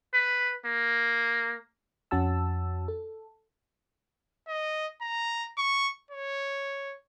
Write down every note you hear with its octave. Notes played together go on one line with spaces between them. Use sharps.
B4
A#3
F2 C#4 F#4 A5 E6
A4
D#5
A#5
C#6
C#5